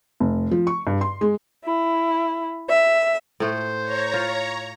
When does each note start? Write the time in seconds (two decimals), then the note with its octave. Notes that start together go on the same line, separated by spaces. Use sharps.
0.20 F1
0.51 F3
0.67 C#6
0.87 G2
1.01 C6
1.21 G#3
1.64 E4
2.68 E5
3.40 A2 A3 C5
3.80 C#5 A#5
4.14 F4